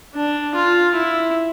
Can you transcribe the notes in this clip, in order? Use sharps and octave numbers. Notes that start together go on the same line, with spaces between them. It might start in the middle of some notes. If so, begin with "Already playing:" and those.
D4
F4
E4